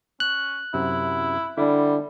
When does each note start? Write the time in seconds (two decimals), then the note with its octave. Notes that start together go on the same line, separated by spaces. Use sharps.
0.20 C#4 F#6
0.74 F#2 C3 E4
1.58 D3 G3 D4 E4